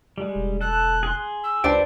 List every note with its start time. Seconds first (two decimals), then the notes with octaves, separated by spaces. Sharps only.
0.18 G3 G#3
0.35 E1
0.61 A4 F#6
1.03 G#4 C6
1.43 E6
1.64 C#2 D4 G4 B4 C5 D5 G5